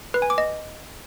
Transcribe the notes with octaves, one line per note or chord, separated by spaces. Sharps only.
B4
G#5
D6
D#5